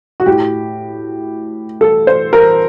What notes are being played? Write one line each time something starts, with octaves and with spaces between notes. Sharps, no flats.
F#4
A2 G4
A4
C5
A#4